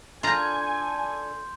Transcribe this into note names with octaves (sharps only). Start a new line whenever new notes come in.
D4 F4 A4 G#5 A#5 C6 G6